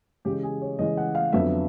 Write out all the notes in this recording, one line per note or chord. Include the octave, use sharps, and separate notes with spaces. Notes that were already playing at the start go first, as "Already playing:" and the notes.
C#3 E3 G#3 G4
G#4
C#5
C#3 E3 G#3 D#5
F#5
F5
F2 D3 F#3 B3 E5